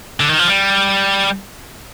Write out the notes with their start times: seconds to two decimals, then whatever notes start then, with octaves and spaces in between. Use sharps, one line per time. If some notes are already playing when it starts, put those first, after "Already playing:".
0.20 D3
0.29 D#3
0.39 F3
0.47 G3